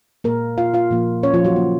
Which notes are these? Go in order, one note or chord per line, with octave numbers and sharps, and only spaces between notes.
A#2 G#3 A#3 A#4
F4 F5
F4 F5
A#2 F3 A#3
C#4 C#5
F3 F4
F#3 F#4
C#3 F#3 A#3